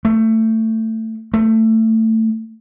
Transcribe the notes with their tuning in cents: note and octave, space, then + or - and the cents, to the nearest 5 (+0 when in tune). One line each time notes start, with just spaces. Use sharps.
A3 +20
A3 +20